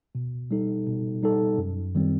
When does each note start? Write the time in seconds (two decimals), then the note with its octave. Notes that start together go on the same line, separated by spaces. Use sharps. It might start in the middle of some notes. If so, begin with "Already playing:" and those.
0.15 B2
0.51 G3 D#4 A4
0.87 B2
1.22 G3 D#4 A4
1.58 F#2
1.95 D#3 G3 C4